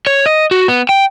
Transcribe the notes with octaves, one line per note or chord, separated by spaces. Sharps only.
C#5
D#5
F#4
B3
G5